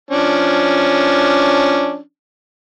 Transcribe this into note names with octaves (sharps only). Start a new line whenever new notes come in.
F3 C#4 D4